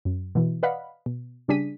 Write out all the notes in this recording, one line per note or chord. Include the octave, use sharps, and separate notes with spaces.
F#2
B2 E3
B4 D5 D#5 F5 F#5 B5
B2
C#3 G3 D4 G#4 B6 D#7